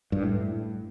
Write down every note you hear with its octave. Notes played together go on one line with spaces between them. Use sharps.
G2
A2